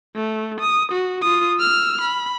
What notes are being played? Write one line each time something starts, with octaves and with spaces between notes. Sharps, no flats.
A3
D#6
F#4
F4 D#6
E6 F6
B5